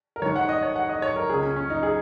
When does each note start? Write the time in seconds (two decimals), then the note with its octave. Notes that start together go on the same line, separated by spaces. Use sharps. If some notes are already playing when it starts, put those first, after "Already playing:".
0.16 A#4
0.22 G#1 G#2 D#3 C#5
0.36 F#5
0.49 D#5
0.63 C#5
0.76 F#5
0.89 D#5
1.02 C#5
1.16 A#4
1.29 C#2 C#3 G#4
1.43 C#4
1.56 C#4
1.70 D#4
1.83 G#4